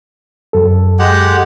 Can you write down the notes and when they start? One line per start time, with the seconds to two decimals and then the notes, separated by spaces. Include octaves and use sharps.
0.53 F#2 A4
0.99 G#3 G4 F#5